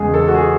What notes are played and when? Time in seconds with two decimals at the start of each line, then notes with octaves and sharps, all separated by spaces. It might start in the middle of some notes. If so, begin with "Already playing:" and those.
Already playing: E2 C#3 G#3 G#4
0.14 A4
0.28 F#4
0.34 G#4